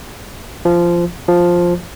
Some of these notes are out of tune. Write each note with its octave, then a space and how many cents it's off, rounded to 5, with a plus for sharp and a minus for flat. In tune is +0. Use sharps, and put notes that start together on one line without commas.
F3 -15
F3 +5